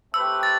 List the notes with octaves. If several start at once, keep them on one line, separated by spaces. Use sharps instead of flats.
A3 C4 G4 B4 E6
A6